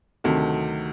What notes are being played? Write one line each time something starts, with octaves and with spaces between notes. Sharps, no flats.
D2 C3 D#3 F#3 A3